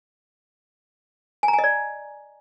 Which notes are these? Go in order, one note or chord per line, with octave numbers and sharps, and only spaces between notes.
G#5
A#5
G#5
D#5
D5